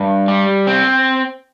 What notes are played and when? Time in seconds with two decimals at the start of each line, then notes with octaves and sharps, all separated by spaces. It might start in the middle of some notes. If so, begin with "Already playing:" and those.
Already playing: G2
0.28 G3
0.67 C4